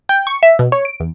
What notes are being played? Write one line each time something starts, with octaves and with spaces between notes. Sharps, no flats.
G5
C#6
E5
B2
C#5
D7
E2